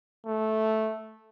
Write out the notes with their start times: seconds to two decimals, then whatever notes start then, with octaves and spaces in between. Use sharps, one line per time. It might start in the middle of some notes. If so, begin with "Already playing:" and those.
0.26 A3